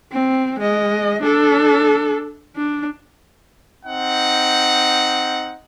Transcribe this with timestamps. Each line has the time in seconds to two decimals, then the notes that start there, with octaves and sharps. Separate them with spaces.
0.12 C4
0.59 G#3 D#5
1.22 D4 A4
2.56 D4
3.85 C4 D#4 F#5